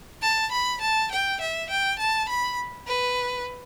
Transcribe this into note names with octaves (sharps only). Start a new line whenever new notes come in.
A5
B5
A5
G5
E5
G5
A5
B5
B4